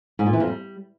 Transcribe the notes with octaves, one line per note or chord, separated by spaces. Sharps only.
G#2
A#2
E3
F2
G3